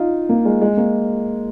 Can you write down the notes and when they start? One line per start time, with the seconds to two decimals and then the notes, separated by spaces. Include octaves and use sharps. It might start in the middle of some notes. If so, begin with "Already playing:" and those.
Already playing: D#4 F4
0.29 A#3
0.45 G#3
0.61 G#3
0.77 A#3